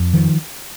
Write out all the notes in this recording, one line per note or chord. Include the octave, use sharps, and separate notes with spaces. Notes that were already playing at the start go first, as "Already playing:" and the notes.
Already playing: F2
D#3 F3